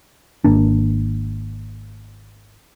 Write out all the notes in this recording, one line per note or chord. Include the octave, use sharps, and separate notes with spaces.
G#1 A#3 D4